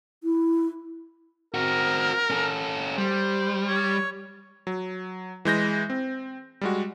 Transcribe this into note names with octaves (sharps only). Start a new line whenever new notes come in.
E4
C4 F#4 A#4
C#4 A4
G3 C5
C#5
F#3
E3 G#3 G6 A#6
C4
G3 G#3 F#4